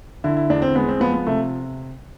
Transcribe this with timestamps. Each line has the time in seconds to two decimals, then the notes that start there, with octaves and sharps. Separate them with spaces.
0.24 D3 E4
0.37 E4
0.50 E2 D4
0.62 C4
0.75 G#3 B3
0.89 C4
1.00 F3 B3
1.14 B3
1.27 C3 A3